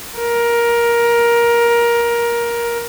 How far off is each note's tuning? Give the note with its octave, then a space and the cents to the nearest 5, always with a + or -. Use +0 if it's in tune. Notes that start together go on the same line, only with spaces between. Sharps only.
A#4 +15